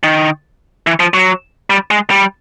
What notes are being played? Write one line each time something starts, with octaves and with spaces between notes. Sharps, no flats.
D#3
E3
F3
F#3
G3
G#3
G3